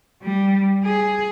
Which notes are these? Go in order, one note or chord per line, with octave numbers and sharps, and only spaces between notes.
G3
G#4